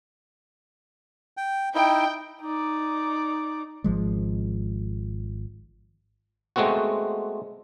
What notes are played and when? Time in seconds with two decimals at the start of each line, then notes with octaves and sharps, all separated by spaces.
1.37 G5
1.75 D#4 E4 G5
2.41 D#4 D5
3.84 G#1 F3 G#3
6.56 G#3 A3 B3 C4 F#4